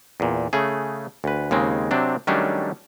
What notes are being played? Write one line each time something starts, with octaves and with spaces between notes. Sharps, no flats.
E2 A#2
C#3 A3 G#4
D2 B4
D#2 C#3 G#3 C4
C3 F#3 C4 D4
D#3 F#3 G3 A3 C#4 D4